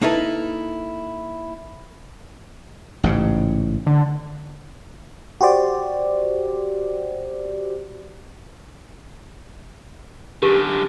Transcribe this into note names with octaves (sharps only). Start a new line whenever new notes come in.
A#3 D#4 E4 A4 B4
A1 G#2 C#3
D3
F#4 G4 C5 D5
F#2 D3 G4